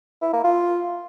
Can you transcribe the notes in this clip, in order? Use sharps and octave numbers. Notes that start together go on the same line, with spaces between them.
E4
A#3
F4